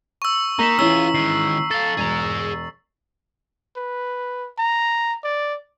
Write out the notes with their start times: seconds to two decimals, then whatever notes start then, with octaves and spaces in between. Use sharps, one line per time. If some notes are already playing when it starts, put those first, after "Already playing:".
0.22 C#6 E6
0.59 A#3 D#4 A#5 B6 E7
0.79 E3 C#4 F4 G#4 E6
1.14 D#3 G#3 C7
1.71 A4 F5 A6
1.98 E1 G#4 A#5
3.76 B4
4.58 A#5
5.24 D5